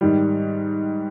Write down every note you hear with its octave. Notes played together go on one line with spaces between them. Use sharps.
G#2 D#3 G3